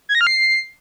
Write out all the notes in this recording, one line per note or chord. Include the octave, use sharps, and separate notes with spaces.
G#6
A#6
F6
C7